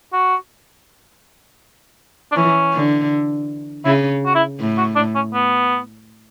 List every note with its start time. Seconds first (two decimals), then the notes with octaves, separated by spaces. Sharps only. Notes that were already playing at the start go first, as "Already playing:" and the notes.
0.13 F#4
2.32 D4
2.36 E3 C#4
2.74 D3
3.85 C#3 E4
4.26 F#4
4.35 E4
4.60 A2
4.78 F#4
4.96 D4
5.15 C#4
5.34 B3